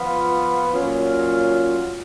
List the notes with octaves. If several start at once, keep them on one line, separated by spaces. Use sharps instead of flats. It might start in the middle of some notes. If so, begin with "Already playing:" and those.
Already playing: F3 B3 F4 B4 F5
A#2 F#3 C#4 F4